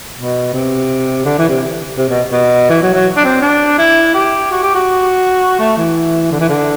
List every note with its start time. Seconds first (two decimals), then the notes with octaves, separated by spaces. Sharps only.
0.17 B2
0.53 C3
1.25 D3
1.38 E3
1.49 C3
1.98 C3
2.09 B2
2.32 B2
2.69 E3
2.83 F#3
2.94 F#3
3.17 D4
3.24 C4
3.42 D4
3.78 E4
4.14 G4
4.51 F#4
4.63 G4
4.75 F#4
5.59 A3
5.77 E3
6.31 D3
6.40 E3
6.49 D3